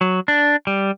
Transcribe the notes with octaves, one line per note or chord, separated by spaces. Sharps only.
F#3
D4
G3